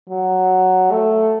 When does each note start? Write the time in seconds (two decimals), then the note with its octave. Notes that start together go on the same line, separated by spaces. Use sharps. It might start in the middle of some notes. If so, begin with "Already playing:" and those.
0.09 F#3
0.91 A3